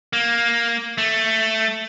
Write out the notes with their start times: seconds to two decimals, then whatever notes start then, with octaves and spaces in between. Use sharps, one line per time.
0.13 A#3
0.98 A3